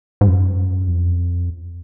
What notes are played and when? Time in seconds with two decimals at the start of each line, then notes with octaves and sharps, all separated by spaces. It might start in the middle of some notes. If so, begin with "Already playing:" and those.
0.21 G#2
0.28 F#2
0.87 F2